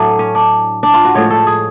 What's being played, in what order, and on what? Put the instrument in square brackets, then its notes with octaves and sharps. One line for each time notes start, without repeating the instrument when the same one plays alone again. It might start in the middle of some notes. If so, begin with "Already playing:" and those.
Already playing: [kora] A2 F#3 A3 D4
C#4
D4
D4
F4
F#4
A2 F3 G#3 C#5
A4
G#4